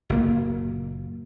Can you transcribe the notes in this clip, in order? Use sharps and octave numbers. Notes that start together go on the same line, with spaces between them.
F#1 A#2 A#3